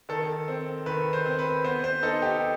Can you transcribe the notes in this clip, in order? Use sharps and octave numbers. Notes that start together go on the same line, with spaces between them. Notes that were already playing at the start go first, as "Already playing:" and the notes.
D#3 A4
C4
D#3 B4
C5
C4
B4
B3 C5
C5
D#4 A4
G4